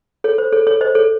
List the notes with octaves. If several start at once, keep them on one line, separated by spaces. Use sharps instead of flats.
A4 C#5
C5
A4 C#5
A4 C#5
C5 D#5
A4 C#5